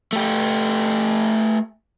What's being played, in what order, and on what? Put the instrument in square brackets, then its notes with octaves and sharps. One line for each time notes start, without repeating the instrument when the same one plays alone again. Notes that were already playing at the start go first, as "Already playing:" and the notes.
[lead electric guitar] A3 G4